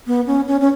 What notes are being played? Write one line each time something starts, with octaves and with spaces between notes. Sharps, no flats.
B3
C#4
C#4
C#4